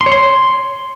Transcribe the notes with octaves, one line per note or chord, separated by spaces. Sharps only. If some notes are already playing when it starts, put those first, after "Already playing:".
C6
C#5
C6